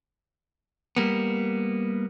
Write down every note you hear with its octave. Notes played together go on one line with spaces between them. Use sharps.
G3 A#3 B3